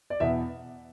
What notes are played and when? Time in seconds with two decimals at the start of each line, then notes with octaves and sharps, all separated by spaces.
0.10 D5
0.20 E2 B2 B3 E5